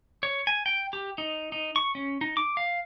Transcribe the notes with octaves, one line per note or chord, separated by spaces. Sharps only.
C#5
G#5
G5
G4
D#4
D#4
C#6
C#4
D#4
D6
F5